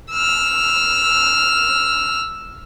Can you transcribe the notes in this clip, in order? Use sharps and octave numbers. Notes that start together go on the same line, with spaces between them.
E6 F6